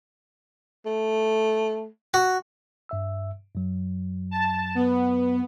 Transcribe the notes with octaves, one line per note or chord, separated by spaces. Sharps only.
A3
F#4
G2 E5 E6
F#2 F#3
A5
B3